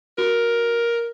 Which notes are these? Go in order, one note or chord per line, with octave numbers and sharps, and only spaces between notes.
F#4 A#4